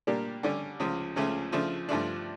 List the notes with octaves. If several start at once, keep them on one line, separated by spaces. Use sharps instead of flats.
A#2 G3 A#3 D4 G4
D3 G3 C#4
C#2 C#3 F3
C#2 C#3 F3 A3 C#4
C#3 F3 A3 D4
G2 F3 A3 D4